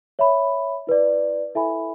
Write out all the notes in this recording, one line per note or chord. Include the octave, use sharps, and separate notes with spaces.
C#5 E5 B5
E4 B4 D5
E4 A4 E5 G#5 B5